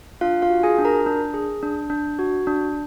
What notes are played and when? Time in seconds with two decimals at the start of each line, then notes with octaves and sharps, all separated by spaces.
0.21 D4 F4 F5
0.42 F4 F5
0.50 F#4
0.63 G#4 G#5
0.78 D4
0.85 A#4 A#5
1.06 D4
1.34 G#4
1.63 D4
1.90 D4
2.19 F#4
2.47 D4